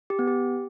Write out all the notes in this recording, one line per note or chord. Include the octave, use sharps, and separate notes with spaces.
G4
B3
G4